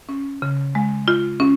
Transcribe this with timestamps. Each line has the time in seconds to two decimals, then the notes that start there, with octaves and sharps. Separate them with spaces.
0.09 C#4
0.42 C#3
0.75 G#3
1.08 F4
1.40 C#4